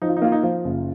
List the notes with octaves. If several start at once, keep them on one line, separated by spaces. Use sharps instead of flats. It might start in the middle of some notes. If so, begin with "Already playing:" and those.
F3 D#4
F4
D#4
A#3 F4
D#4
F3 F4
F#1